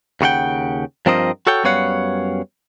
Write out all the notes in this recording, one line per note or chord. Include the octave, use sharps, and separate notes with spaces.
D#2 C#3 F#4 F#5 G5
G2 F3 C4 A#4 C5 D#5
F#4 A4 C#5 G5
F#2 G3 B3 C#5 F5 F#5